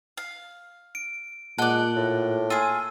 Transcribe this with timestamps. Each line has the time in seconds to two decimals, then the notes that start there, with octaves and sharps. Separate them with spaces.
0.17 F5
0.95 D7
1.58 A#2 G#3 D5 F#5 A5 F#6 G7
1.96 A2
2.50 F4 G#4 E6